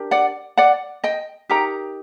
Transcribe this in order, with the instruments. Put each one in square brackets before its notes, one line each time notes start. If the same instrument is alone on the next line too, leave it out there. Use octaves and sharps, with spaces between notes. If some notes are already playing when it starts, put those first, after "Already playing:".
Already playing: [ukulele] D4 G4 A#4
D5 F#5
D5 F#5
D#5 G5
D#4 G4 A#4 G5 A#5